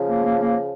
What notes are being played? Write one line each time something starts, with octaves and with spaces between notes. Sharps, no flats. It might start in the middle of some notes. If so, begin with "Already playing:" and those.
Already playing: C#3 F3
A#3
A#3
A#3